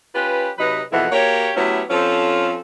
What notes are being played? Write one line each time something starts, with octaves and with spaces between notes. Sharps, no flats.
C#4 F4 G4 B4
C3 F#3 D#4 B4
F2 B2 E3 G#3 E4 F#5
A#3 F#4 G4 C#5
F#3 A3 B3 C#4 E4 G4
F3 C4 C#4 F4 A4